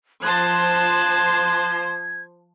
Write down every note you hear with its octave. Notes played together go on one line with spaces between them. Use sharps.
F3 C5 A5 F#6 G#6